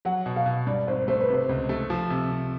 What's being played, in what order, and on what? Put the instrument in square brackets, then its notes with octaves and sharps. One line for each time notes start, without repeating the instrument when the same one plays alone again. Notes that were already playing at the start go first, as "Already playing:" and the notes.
[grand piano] F#3 [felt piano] F#5
[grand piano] B2
[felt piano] F5
[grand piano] B2
[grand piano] G2 [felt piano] D5
[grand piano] G#1 [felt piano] C5
[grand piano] A3 [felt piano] C5
[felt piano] B4
[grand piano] C3 [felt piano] C5
[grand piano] C#2
A3
F3
C3
C3